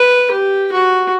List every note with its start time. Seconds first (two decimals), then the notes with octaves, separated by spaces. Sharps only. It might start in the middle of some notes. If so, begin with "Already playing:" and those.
Already playing: B4
0.31 G4
0.72 F#4